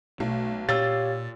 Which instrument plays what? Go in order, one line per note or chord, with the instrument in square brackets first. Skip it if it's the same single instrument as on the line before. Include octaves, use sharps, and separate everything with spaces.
[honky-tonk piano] B1 [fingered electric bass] A3
[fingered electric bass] A#2 [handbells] G4 C#5 F5 [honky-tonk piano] E6 A6